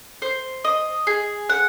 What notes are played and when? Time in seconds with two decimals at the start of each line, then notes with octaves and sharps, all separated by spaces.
0.22 C5
0.64 D#5
1.07 G#4
1.50 F#5